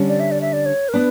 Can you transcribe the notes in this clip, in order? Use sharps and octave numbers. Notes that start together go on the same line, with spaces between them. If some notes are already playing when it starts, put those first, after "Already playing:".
Already playing: D3 G3 C#4
D5
E5
D5
E5
D5
C#5
A#4
B3 D4 B4